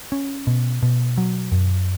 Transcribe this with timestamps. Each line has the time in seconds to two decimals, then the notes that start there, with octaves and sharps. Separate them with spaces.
0.12 C#4
0.47 B2
0.83 B2
1.18 F#3
1.52 F#2